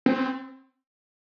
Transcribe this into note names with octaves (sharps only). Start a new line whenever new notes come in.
C4